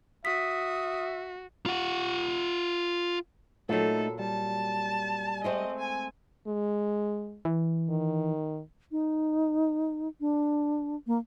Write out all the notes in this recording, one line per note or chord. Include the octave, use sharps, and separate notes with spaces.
F#4 E5 D#6 B6
F4 F#5
A#2 F#3 A3 D#4 A4
G3 A5
G#3 A3 C4 D#5
G#5
G#3
E3
D#3
D#4
D4
A#3